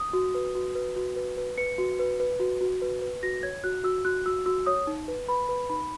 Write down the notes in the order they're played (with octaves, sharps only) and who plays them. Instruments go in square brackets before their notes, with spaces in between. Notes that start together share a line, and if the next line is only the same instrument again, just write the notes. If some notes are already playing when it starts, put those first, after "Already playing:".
Already playing: [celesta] D#6
F#4
B4
F#4
B4
F#4
B4
B4
B4 C#7
F#4
B4
B4
F#4
F#4
B4
B4
F#4 A#6
C#5 G#6
F#4 F#6
F#4 E6
F#4 F#6
F#4 E6
F#4 E6
C#5 D#6
D#4
B4
B4 B5
B4
D#4 B5